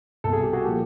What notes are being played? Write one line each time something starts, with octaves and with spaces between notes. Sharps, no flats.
C2 B2 A4
G#4
G4
F#4 G#4
A#2 F3 G4 A4